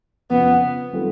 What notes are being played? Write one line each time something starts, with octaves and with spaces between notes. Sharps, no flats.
F2 C#3 F3 B3
D#3 G3 C4 F4 A4